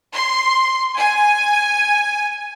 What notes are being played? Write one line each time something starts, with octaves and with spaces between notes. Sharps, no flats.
C6
G#5